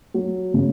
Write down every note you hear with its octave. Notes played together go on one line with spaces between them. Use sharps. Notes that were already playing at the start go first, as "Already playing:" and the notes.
F#3
C#3